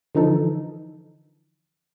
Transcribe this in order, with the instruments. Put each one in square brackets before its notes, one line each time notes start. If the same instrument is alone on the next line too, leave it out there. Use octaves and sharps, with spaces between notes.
[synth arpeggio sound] D3 E3 F3 D#4 A4